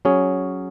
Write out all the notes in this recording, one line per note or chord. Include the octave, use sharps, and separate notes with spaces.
F#3 C#4 G#4